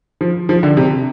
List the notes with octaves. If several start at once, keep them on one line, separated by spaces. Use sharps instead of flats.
F3
F3
D3
C3